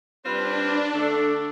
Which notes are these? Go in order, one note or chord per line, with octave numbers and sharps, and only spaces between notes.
G3 C4 D4 F4 B4
D3 A3 D4 A4